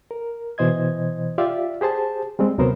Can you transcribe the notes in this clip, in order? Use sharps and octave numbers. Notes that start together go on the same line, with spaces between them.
A#4
B2 E3 C5 D#5 G#6
F4 G4 D5 E5 F5
G4 G#4 C5 A5
G3 G#3 C4
D2 C3 F#3 B3 A#4 C5